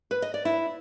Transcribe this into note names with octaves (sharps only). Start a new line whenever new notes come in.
B4
D#5
D5
E4